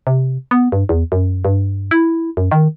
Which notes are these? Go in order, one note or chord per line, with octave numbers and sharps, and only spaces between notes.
C3
B3
G2
E2
F#2
G2
E4
F#2
D#3